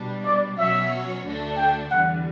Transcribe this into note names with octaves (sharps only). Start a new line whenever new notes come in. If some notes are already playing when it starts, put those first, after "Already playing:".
Already playing: B2 G3 D4
D5
B2 F#3 C#4 F#4 C#5 E5
D2 D3 A3 D4 A4
G5
E2 D3 G3 F#5